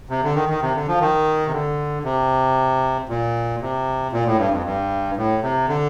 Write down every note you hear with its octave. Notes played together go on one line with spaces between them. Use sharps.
C3
D3
D#3
D#3
C3
D3
F3
D#3
C3
D3
C3
A#2
C3
A#2
A2
G2
F2
G2
A2
C3
D3